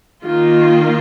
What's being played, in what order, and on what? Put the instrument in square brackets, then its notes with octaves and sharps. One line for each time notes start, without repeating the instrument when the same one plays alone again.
[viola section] D#3 A#3 F4